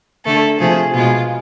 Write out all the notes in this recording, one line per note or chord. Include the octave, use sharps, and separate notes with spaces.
D3 A3 A4
C3 F3 A3 G#4
B2 G#3 F4